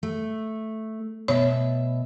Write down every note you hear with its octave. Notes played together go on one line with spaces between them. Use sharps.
A3
B2 C#5 E5